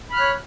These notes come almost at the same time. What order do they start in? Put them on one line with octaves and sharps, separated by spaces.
B5 F6 F#6 C#5